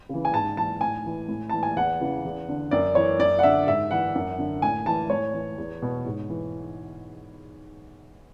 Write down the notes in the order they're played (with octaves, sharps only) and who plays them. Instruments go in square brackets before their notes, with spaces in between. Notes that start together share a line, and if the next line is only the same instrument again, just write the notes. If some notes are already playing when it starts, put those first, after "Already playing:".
[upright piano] C#3 E3
G#5
G#2 A5
E3 A5
A2 G#5
E3
A2
E3 A5
G#5
E2 F#5
C#3 E3
E2
D3
F#2 D5
E3 C#5
F#2 D5
F#5
D3 E5
G#2 E5
E3 F#5
F#2
D3
A2 G#5
E3 A5
A2 C#5
E3
E2
B2
G#2
E3